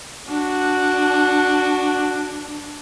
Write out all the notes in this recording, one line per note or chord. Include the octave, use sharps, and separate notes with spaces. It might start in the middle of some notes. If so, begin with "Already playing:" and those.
D4 F#4